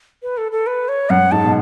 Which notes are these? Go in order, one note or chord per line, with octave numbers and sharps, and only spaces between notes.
B4
A4
A4
B4
C#5
F#2 F#5
G#2 A5
B2